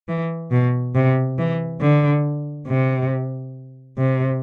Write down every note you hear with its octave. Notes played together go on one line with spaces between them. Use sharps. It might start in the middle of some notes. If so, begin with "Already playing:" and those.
E3
B2
C3
E3
D3
C3
C3